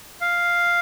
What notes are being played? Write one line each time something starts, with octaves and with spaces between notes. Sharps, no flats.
F5